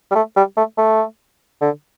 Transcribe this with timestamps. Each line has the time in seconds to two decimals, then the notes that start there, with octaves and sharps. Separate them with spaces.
0.11 G3
0.15 A3
0.37 G3
0.57 A3
0.78 A3
1.61 D3